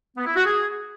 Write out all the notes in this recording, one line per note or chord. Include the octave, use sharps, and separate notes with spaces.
B3
E4
F#4
G#4